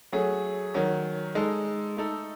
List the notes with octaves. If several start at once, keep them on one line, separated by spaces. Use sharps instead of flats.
F#3 A3 C#4 G#4
D#3 F#3 C#4
G#3 D#4 A4
A3 D#4 A4